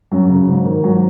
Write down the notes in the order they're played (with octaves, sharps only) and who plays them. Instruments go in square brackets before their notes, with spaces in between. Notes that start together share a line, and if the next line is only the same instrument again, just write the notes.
[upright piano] F#2 F#3
C#3
G#2
D#3
G#2 F#3